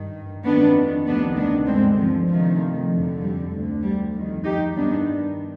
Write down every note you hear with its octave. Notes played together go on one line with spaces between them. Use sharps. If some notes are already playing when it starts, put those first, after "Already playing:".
Already playing: G2 D#3
F2 D#3 B3 D4
D2 C3 D#3 B3 D4
B3 D4
G2 D3 G#3 C4
F3
D2 C3 D#3 F3
F2 D3
G3
D2 D3
G3
F2 D#3
D#4 G4
G2 D#3 B3 D4